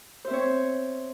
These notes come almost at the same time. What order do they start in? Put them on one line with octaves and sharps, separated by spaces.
C5 E5 C4 C#5